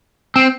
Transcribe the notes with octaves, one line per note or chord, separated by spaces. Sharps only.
C4